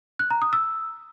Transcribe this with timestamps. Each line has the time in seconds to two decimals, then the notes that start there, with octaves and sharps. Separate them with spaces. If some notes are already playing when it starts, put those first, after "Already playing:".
0.19 F#6
0.31 A#5
0.42 D#6
0.53 E6